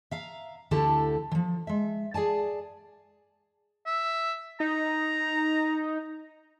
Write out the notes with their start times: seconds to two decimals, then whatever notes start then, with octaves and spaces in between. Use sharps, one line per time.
0.11 E5 F5 A#5
0.71 D2 D3 E4 G4 A4 A5
1.31 E3 F3
1.67 G#3 E5
2.14 G#4 D5 G#5 A5
3.86 E5
4.60 D#4 A#5